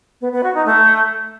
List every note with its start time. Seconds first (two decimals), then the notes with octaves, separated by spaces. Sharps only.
0.21 B3
0.32 B3
0.43 F#4
0.54 D#4
0.66 A3